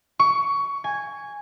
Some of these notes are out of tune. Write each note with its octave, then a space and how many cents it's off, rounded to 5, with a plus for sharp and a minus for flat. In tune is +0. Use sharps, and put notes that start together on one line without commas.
C#6 +20
G#5 -5